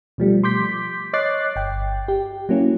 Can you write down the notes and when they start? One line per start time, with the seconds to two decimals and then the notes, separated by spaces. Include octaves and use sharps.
0.18 B2 F3 G3 A3
0.44 C6 D6 G6 B6
1.13 C#5 D#5 D6 F#6 A6 C7
1.56 G1 G5
2.08 G4
2.49 F#3 A#3 C#4 E4